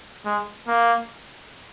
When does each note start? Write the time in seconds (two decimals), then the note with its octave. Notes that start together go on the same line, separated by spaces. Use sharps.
0.25 G#3
0.67 A#3